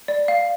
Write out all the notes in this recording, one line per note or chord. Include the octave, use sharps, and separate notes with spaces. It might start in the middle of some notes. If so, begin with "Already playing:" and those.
D5
F5